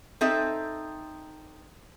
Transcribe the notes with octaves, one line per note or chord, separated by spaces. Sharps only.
C4 D#4 A4 E5